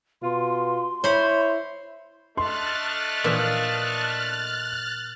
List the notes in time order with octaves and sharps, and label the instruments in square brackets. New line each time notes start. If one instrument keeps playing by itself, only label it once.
[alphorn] B2 [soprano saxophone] F4 [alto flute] C6
[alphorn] E4 [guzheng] C5 B5 [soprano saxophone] C#5
[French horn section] A3 D4 D#5 [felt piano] C6 [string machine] F6 F#6 A6
[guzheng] A#2 E3 F3